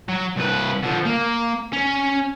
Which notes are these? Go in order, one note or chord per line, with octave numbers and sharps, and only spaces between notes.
F#3
C2 B4
D3 F3
A#3
C#4